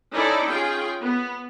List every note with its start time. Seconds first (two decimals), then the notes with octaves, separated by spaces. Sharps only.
0.12 C#4 D#4 E4 A4 D5
0.48 C#4 F4 G#4 G5
1.02 B3